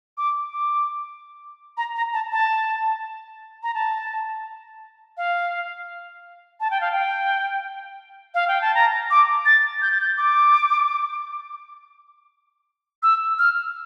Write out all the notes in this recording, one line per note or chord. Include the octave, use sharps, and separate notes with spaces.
D6
D6
A#5
A#5
A5
A5
A#5
A5
F5
A5
G5
F5
G5
F5
G5
A5
A#5
D6
A6
G6
A6
G6
D6
E6
F6